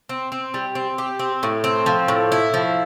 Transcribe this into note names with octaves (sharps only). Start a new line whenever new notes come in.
C4
C4
G3
C4
G4
C4
A2
C4
F3
A2
E4
F3